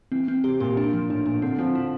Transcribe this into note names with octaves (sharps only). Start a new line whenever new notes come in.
E3 C4
C4
C3 G4
A#2 G4
D4
F3
A2 D4
A#2 D4
D3 C4
F3 C4
E4